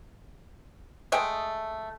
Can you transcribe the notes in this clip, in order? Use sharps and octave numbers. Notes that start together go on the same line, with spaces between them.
G#3 A3 D#5 G5